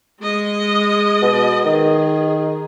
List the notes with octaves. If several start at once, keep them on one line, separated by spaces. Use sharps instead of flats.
G#3 D#5
B2
D#3 G#4